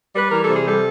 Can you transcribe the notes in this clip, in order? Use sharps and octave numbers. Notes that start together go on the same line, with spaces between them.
G3 B4
E3 A#4
A4
C3 G#4
G3 A4